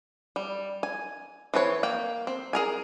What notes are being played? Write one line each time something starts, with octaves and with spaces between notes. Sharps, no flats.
G3
G#5
E3 C4 B4 C#5
A#3 G5
C4
G#4 A#4 G#5